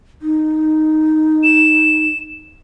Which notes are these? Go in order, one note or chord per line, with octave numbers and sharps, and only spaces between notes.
D#4
E7